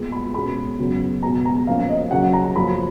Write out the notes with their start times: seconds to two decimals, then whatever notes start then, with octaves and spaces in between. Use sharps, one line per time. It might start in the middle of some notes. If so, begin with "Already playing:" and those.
Already playing: A#2 G#3 B3
0.12 B5
0.34 B2 G#3 C#4 B5
0.79 F#2 C#3 F#3 B3
1.23 B2 G#3 B3 A#5
1.45 A#5
1.67 A#2 F3 A#3 C#4 F5
1.89 D#5
2.11 C#3 F#3 C#4 F#5
2.33 A#5
2.56 F#2 F3 A#3 C#4 B5